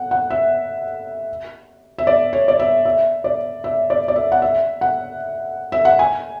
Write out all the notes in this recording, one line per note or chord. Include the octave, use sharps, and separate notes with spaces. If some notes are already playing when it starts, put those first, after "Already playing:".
Already playing: F#5
F#5
E5
E5
D5
C#5
D5
E5
E5
D5
E5
D5
D5
E5
F#5
E5
F#5
E5
F#5
G#5